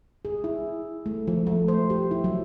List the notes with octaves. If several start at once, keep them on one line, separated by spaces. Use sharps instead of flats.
G#4
E4
A3
F3
A3
C5
G4
E4
F#3